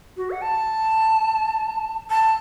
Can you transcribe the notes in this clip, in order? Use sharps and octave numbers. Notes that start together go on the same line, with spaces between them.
F#4
F#5
A5
A5